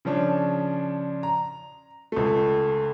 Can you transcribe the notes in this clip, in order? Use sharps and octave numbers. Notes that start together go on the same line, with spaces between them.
C#3 F3 C#4 D4
A#5
C#2 A3